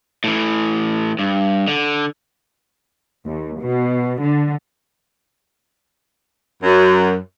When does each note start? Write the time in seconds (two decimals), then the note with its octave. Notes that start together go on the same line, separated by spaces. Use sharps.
0.24 A2 E3
1.19 G2
1.68 D3
3.26 D#2
3.60 B2
4.21 D3
6.63 F#2